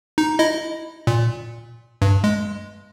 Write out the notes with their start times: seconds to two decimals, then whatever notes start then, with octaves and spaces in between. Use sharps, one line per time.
0.18 D#4
0.39 E4 D#5
1.07 A#2
2.02 G2
2.24 G#3